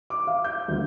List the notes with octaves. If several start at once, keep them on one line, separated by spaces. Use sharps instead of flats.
D6
F5
G6
D2